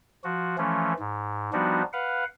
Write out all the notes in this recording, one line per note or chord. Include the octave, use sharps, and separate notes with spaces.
F3 F#4
E3 F3 A3 C#4
G#2
F3 G3 B3 D4 D#4 F#4
B4 F5 F#5